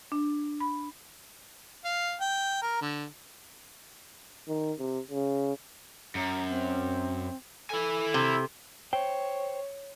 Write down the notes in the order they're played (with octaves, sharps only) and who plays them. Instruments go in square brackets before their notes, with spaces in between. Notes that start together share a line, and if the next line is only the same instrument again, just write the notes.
[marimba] D4
B5
[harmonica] F5
G5
A#4
D3
[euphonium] D#3
C3
C#3
[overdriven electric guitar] F#2 [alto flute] A#5
[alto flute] C4
[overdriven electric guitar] E4 G#5 [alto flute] A4
[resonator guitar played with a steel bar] C3
[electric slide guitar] C5 G5 [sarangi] C#5